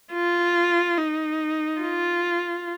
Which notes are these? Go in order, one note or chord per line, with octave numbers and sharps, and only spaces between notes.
F4
D#4
F4